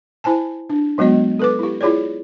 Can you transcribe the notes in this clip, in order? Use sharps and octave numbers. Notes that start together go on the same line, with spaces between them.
E4 C5 G#5 A5
D4
F#3 G#3 B3 F#4 D#5
A4 B4 D6
E4 G4
E4 F4 G#4 C#5 D5